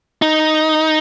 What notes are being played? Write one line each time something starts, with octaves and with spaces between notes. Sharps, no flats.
D#4